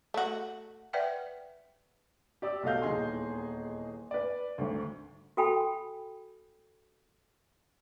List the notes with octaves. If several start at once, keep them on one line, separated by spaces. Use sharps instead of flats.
A3 F#4
B4 D5 E5 F#5 G5
G4 D5 D6 E6
B1 B2 A4 D#5 F5 G6
D#1 E2 D#4 G#4 C6
B4 D5
G#1 D2
F#4 A4 G5 G#5 B5